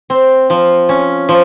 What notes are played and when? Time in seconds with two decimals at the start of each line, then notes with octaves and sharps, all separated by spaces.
0.10 C4
0.50 F3
0.89 C#4
1.29 F3